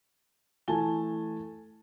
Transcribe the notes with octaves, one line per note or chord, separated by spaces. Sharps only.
E3 A3 G#5 A5 G7